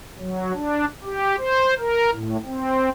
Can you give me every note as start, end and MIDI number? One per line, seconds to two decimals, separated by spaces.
0.19 0.52 54
0.54 0.85 62
1.04 1.36 67
1.38 1.74 72
1.79 2.10 70
2.12 2.37 45
2.46 2.89 60